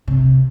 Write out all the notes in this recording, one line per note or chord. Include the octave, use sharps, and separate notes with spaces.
C3